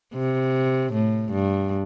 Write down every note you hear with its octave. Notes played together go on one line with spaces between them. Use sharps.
C3
A2
G2